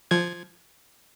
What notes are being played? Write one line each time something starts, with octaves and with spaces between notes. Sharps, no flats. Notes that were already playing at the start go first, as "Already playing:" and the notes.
F3 G#6